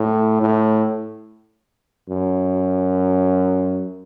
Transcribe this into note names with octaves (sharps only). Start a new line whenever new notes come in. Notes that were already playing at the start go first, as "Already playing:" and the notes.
Already playing: A2
A2
F#2